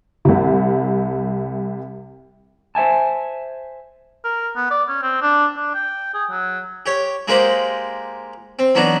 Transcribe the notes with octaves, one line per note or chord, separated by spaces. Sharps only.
C2 C3
C5 E5 G#5 A5
A#4
B3
D5
C#4
C4
D4
D4
G5
G#4
F#3
G4 C#5
G#3 A#3 D#4 G4 C5 F#5
C4
E3 F#3 B3 D4 D#4